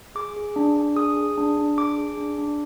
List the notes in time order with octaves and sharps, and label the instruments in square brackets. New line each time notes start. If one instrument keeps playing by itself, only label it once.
[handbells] G#4 D6
G#4
D4
D4
G#4 D#6
G#4
D4
D4
G#4 D6
G#4
D4
D4